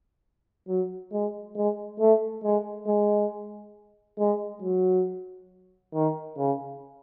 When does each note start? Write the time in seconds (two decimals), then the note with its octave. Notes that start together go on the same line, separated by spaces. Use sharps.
0.68 F#3
1.12 G#3
1.56 G#3
2.00 A3
2.43 G#3
2.87 G#3
4.19 G#3
4.62 F#3
5.94 D#3
6.38 C#3